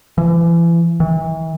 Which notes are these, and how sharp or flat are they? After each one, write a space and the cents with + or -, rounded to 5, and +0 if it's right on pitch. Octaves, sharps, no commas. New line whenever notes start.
E3 +35
E3 -35